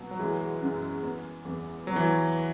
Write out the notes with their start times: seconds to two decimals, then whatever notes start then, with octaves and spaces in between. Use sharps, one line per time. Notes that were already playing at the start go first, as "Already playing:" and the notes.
Already playing: B2 F#3
0.11 F#3
0.19 E3 G#3
0.61 F#2
1.03 B3
1.45 E2
1.87 F#3 B3
1.96 E3
2.04 F#3